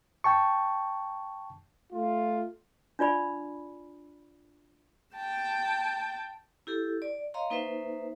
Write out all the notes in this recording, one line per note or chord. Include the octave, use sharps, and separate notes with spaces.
G5 A5 C#6
A3 F4
D4 F4 D5 B5
G5 A5
E4 G4 A4
D5
C#5 D#5 F5 A#5 C6
A#3 D#4 B4 C5 E5